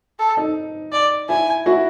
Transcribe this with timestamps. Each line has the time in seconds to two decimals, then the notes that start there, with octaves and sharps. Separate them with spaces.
0.19 A4
0.37 D#4
0.92 D5
1.29 E4 G#5
1.66 E4 F#4